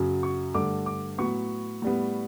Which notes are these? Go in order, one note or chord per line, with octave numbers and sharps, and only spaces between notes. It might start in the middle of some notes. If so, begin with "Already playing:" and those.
Already playing: F#2 C#3 F#3
C#6
G2 D3 A3 D6
D6
A2 F#3 B3 C#6
A2 G3 B3